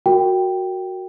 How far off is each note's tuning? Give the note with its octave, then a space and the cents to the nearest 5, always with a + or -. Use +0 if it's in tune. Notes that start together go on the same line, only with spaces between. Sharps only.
F#4 +0 A#4 -15 G5 +0